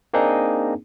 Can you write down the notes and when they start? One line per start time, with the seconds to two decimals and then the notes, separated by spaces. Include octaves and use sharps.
0.13 A#3 C4 D4 D#4 G#4